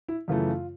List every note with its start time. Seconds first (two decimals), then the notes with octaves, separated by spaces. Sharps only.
0.08 E4
0.28 F#2 C#3 E3 A3 F4